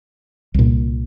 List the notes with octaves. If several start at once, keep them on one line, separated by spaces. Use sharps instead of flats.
C2 A#2